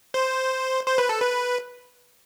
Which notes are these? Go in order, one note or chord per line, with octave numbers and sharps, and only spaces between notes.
C5
C5
B4
A4
B4